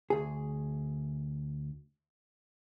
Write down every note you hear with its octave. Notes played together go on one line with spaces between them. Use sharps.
D2 G#4